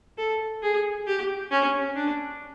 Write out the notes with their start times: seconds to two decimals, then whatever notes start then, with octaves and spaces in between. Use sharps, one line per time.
0.18 A4
0.62 G#4
1.07 G4
1.51 C#4
1.96 D4